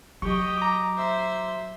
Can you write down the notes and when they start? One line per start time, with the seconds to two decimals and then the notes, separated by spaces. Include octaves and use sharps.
0.22 F#3 G4 D#5 C#6
0.58 A#5 D6
0.97 C5 E5